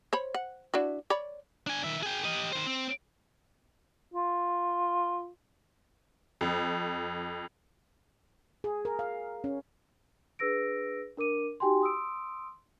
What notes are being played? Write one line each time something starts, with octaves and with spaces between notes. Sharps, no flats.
C5 C#5 B5
F#5
D4 E4 F#4
C#5 D5 B5
D4 G#5
D#3 E5
G#4 G5
G4 D#5
D#3 C5
C4
F4
F2
G#4
A#4
F5
C#4
D4 G#4 B4 E6 A#6 D7
D4 A#4 D6 D#7
D#4 F#4 G4 G5 G#5 C6
C6 D#6 E6 D7